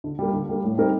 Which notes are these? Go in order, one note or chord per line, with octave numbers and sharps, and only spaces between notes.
D3
G3 A#3
D3
G3 A#3
A2
G3 C4 D#4 A#4